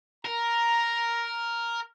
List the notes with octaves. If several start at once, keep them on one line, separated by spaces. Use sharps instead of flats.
A#4 A#5